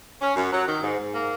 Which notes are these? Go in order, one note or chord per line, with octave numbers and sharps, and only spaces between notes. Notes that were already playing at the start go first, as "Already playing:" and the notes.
C#4
F#2
F#3
D#3
G#2
G#2
A#3